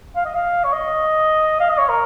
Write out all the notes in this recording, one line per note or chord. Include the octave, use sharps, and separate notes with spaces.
F5
D#5
F5
C#5
D#5
F5
D#5
C#5
A#4